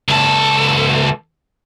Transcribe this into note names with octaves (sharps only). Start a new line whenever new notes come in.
C#2 A4